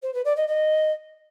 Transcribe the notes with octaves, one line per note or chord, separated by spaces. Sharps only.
C5
B4
D5
D#5
D#5